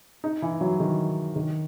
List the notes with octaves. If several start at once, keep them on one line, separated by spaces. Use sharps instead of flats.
D#4
E3
F#3
D#3
D#3